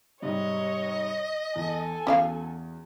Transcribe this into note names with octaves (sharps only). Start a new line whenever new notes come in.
G#2 C3 G3 C#5 D#5
E2 A4 G#5
E2 C#4 F#4 D5 F5